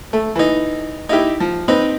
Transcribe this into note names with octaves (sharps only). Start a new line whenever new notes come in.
A3
E3 D#4
D#4 E4 G4
F3
C4 D#4 B4